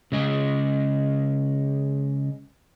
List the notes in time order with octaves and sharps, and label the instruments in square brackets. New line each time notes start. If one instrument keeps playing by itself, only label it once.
[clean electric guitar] C#3 G#3 G#4